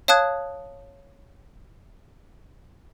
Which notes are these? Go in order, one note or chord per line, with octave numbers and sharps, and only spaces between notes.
C#5 F5 A5 D#6 F#6 G#6